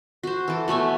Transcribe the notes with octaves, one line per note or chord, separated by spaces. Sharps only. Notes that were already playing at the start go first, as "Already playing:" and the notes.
F#4 C5
E3 A4
B2 A3 C#5 G#5